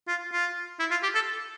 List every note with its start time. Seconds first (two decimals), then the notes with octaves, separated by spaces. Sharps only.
0.08 F4
0.32 F4
0.79 E4
0.91 F4
1.03 G4
1.15 A4